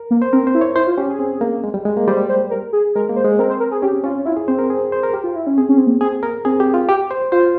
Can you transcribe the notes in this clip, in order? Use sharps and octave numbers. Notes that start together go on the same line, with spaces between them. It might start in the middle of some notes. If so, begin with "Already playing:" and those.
Already playing: A#4
A#3
C5
C4 A#4
C5
E4
C#5
E4 C5
F4
C#4 G4
G#4
C4
A#3
G#3
G3
G#3
A#3
G3 C5
C5
A#4
G#4
G#3 A#4
A#3
C5
G#3
C4 A#4
C5
A#4
G#4
C#4 G4
C#4 F4
C#4
E4 F4
G#4
C4 C5
A#4
G#4
C5
A#4
G4
F4
E4
C#4
C4 G#4
C#4
C4
A#3
C4 G#4
A#3 A#4
C4 G#4
G4
F4
G4
C5
F4 C5